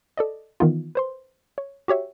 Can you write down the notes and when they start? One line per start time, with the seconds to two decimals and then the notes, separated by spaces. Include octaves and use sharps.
0.17 A4 D5 D#5
0.60 D#3 E3 B3 D#4 F4
0.95 B4 C5 C6
1.58 C#5
1.88 F#4 G4 C#5 E5